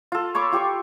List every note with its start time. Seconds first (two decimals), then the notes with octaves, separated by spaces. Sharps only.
0.12 F4 A4
0.35 C#5 B5 C#6 D6
0.52 F4 G4 C6 C#6